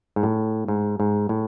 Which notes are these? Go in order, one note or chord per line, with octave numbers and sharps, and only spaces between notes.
G#2
A2
G#2
G#2
A2